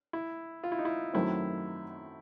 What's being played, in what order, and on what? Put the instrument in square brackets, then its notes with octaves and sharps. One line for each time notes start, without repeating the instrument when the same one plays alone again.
[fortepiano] E4
F4
E4
D#4
E4
[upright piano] F#2 D#3 F#3 A3 C4 [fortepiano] E4